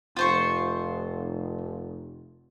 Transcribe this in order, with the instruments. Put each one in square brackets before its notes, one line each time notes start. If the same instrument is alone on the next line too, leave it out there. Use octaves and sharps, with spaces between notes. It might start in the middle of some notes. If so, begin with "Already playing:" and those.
[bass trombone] F1 [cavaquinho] F4 C5 C#6